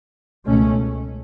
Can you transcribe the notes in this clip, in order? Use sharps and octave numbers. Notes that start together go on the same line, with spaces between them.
C#2 B2 A3 C#4